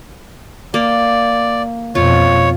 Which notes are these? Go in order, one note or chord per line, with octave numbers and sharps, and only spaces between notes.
A#3 D5
F2 B2 F4 C#5